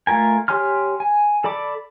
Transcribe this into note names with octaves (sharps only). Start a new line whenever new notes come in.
A3 F4 A#4 G#5
G4 C#5 G#5 C6 F6
G#5
A4 D5 B5 D6